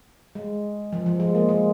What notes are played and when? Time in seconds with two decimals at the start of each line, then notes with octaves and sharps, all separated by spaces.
0.35 G#3
0.93 F3
1.06 F3
1.20 G#3
1.35 A#3
1.49 G#3